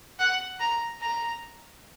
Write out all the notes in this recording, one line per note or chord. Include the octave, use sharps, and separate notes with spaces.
F#5
A#5
A#5